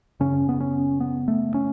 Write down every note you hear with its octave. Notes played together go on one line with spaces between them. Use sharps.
F#2 C#3 C#4
B3
C#4
B3
A3
C#4